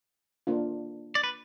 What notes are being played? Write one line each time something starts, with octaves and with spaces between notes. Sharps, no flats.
A#3 D4 F4
D5
B4